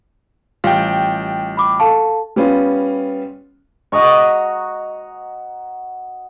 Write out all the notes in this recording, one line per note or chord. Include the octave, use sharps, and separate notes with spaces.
A1 G3 F4 G5 F6
B5 D6
A4 F5 A5 C#6
G3 B3 C#4 F4
F#4 D#5 A#5 C#6